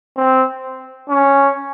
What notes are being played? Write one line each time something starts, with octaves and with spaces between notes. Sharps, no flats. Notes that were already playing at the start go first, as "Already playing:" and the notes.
C4
C#4